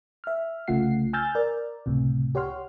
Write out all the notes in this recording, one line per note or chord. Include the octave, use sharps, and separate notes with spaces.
E5 F6
C2 C#3 A3 F4 F#5 C7
G#5 E6 F6 G6 A6
A#4 D5
C#2 A2 C3
G4 C#5 F#5 C6 F6